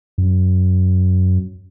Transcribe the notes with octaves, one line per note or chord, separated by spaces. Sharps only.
F#2